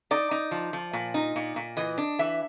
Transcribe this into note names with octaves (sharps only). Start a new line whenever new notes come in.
D#4 D5
D#4
F3
F3
A#2
D#4
A#2
A#2
E3 D#5
D4
E3 E5